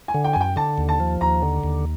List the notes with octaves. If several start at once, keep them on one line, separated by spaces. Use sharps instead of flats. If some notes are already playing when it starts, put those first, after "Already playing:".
G#5
D3
G5
G#5
F#2 G5
D3 A5
D#2
A5
F3
D#2 A#5
D3
D#2